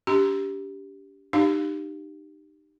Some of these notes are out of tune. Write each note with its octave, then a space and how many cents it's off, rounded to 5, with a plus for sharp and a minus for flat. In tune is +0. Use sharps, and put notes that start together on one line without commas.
D4 -40 G4 +0 A#5 +25
D#4 -30 G4 +0 F5 +0